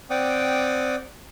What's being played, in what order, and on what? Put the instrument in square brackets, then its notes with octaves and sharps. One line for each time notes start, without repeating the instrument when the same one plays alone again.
[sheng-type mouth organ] C4 D5 F#5 G5 D6 D#6